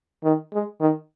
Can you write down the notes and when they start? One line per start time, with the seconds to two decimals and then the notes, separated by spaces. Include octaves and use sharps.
0.24 D#3
0.53 G#3
0.81 D#3